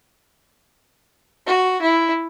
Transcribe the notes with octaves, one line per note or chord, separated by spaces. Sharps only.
F#4
E4